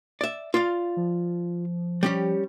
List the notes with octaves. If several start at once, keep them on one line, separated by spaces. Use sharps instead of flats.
D5 E5
F4 D5 F5
F3
G3 C#4 G4